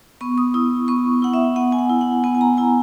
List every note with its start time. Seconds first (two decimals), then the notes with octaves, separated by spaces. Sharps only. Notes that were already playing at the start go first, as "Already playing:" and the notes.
0.21 B3 C#6
0.38 D#6
0.54 E4 D#6
0.88 B3 C#6
1.22 E4 F#5
1.34 E5
1.56 B3 F#5
1.72 G#5
1.79 F#5
1.90 E4
2.01 F#5
2.24 B3 G#5
2.35 G#5
2.41 A#5
2.57 E4 G#5